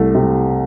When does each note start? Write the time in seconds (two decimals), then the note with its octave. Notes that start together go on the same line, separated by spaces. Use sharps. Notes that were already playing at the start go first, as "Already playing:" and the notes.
Already playing: C2 A3
0.15 C3